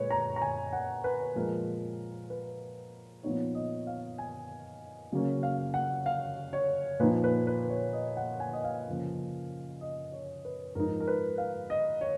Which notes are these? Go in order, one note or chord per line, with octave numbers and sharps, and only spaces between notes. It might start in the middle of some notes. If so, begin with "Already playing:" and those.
Already playing: A#2 G#3 B4 C#5
A#5
A#5
G#5
F#5
B4
A#2 F3 G#3 A#4
B4
A#2 F3 B3 D#4 C#5
D#5
F5
G#5
C#3 F#3 A#3 C#4
F5
F#5
F5
C#5
A#2 F3 A#3 D#4 B4
B4
B4
C#5
D#5
F#5
G#5
D#5
F5
C#3 F3 A#3 C#4
D#5
C#5
B4
G#2 F3 G#3 D#4 A#4
A#4
B4
F5
D#5
C#5